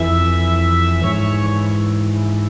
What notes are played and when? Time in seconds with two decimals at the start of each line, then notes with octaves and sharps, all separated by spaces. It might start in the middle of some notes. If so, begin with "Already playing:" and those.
Already playing: F2 E3 E5
1.04 G#2 E3 C#5